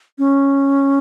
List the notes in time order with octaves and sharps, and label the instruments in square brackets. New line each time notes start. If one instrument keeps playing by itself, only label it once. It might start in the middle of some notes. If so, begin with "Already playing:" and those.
[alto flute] C#4